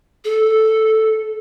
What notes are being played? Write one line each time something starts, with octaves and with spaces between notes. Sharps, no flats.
A4